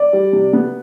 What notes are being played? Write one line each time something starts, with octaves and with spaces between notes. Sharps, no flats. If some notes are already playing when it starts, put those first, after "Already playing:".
Already playing: D5
G3
C3
B3